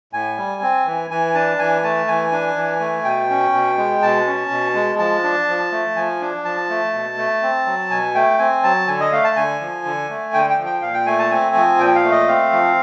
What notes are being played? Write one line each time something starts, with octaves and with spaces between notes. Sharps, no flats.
A2 G#5
G3
C4
E3
E3 G#5
D4 A5
E3 G#5
A3 A5
E3 G#5
D4
E3
A3
B2 G5
C#4
B2
G#3
B2 A5
C#4
B2
G#3
F3 A5
D4
F3
A3
F3 G#5
D4
F3 A5
A3
B2
A3
C4
F#3
B2 G#5
A3 G5
C4 G#5
F#3 A5
D3 G#5
D#5
A3 F5
A5
D3 G#5
F3
D3
A3
D3 G5
G5
F3
G5
A#2 F5
G5
A3 G#5
A5
C4 G#5
F3
A#2 G5
F5
A3
D#5
C4 F5
F3